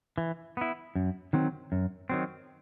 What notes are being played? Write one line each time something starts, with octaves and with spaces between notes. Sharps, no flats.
E3
B3 E4
F#2
D#3 F#3 C4
F#2
D#3 F#3 C4